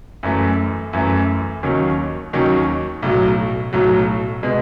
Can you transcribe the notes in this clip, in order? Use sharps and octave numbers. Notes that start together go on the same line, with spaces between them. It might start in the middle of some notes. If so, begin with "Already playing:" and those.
F#2 E3 A3
F#2 E3 A3
D#2 D#3 F#3 C#4
D#2 D#3 F#3 C#4
B1 A2 F#3
B1 A2 F#3
B2 G#3 B3